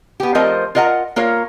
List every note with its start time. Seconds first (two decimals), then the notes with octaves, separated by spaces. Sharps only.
0.20 B3 G4
0.35 F3 A3 C4 A#4 C5 D#5
0.75 F4 A#4 D#5 F#5 A#5
1.16 A#3 F4 A#4 C#5